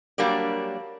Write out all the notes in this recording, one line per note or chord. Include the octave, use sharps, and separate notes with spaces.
F#3 G3 A#3 D4 G4 D5